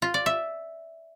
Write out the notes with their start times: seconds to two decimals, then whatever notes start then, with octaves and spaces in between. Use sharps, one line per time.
0.02 F4
0.14 D5
0.26 E5